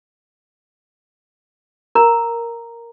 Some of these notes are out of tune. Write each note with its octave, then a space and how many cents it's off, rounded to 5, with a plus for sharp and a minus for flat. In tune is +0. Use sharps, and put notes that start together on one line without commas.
A#4 +0 A#5 -5